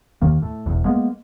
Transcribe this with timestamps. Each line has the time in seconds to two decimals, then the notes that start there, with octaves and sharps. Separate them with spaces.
0.22 D#2 D#3 A#3
0.42 A2
0.66 E1 B1 E2
0.85 G#3 A#3 B3